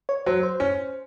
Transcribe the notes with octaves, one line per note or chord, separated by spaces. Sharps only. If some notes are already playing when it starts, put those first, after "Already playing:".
C#5
F#3 C5
C5
C#4